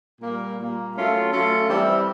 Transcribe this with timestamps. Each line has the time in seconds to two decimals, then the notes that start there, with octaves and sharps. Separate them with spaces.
0.20 A#2 G3 A#3
0.57 A#2 G3 A#3
0.95 F#3 A3 C#4 F4 A4
1.32 F#3 A3 C#4 F4 A4
1.68 E3 G3 C4 E4 G4